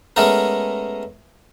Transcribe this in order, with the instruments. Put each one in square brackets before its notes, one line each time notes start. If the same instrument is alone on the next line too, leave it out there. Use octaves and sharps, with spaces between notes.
[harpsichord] G#3 A3 B3 C#4 A#4